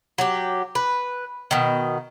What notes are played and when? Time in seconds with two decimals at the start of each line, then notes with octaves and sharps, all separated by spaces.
0.18 F#3 G4
0.75 B4
1.51 B2 D#3